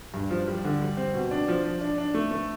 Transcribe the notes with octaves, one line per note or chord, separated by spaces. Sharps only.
G2
F3
G3
D3
G3
C4
B2
D4
F3
F3
D4
D4
A3
A3